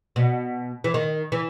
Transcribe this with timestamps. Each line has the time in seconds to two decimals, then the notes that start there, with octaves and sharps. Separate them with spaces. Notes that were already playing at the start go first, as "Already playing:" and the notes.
0.16 B2
0.84 E3
0.94 D#3
1.32 E3